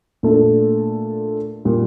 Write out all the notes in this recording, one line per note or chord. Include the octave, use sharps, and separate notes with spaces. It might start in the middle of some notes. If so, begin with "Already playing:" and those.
A#2 A3 D4 A4
A#2 G3 A#3